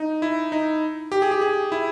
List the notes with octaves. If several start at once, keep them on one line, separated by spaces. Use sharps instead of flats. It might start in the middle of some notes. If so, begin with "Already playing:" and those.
Already playing: D#4
E4
D#4
G4
G#4
G4
G#4
E4